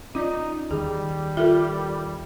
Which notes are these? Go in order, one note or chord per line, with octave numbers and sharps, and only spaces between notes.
C#4 D#4 F4 D5 D#5
D#2 D#3 G3 G#4
F4 A4 A#4 E5